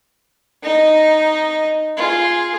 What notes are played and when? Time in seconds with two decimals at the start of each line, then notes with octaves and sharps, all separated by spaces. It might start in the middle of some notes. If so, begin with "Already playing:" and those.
0.63 D#4 D#5
1.97 F4 G#4